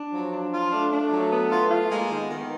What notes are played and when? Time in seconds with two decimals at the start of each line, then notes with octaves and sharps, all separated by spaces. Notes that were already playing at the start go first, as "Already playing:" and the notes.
Already playing: D4
0.13 F3 F#3
0.33 D4
0.53 F4
0.72 A3 D4
0.93 D4
1.02 A3
1.12 F#3
1.32 B3
1.51 F4
1.71 F4
1.91 G#3 A#3
2.11 D#3
2.20 B3
2.30 D#3